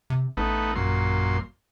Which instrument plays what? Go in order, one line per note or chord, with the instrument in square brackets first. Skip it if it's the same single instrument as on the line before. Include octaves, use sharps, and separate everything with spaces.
[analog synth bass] C3
[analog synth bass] A1 [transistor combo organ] A3 B3 D#4
[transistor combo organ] F#2 A#2 C6